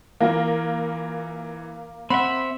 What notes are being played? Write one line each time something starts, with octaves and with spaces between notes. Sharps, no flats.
E3 A#3 F4
C4 E5 F#5 B5